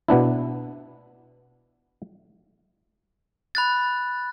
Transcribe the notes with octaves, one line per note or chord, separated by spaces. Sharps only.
B2 B3 D4 E4
B5 F#6 A6